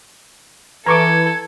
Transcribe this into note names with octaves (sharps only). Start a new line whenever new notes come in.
E3 A4 B4 A#5 C#6 D6 G#6